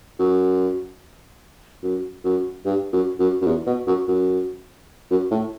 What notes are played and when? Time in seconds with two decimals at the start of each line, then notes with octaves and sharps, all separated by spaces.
0.19 F#2
1.83 F#2
2.24 F#2
2.65 G2
2.93 F#2
3.20 F#2
3.41 F#2
3.47 E2
3.67 B2
3.87 F#2
4.08 F#2
5.11 F#2
5.31 A2